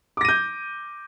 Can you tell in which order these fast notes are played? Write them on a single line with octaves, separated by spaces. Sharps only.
D6 A#6 D#7 G6